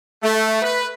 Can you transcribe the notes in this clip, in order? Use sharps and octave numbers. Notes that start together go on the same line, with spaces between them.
A3
B4